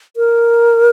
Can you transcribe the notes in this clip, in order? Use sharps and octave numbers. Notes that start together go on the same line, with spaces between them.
A#4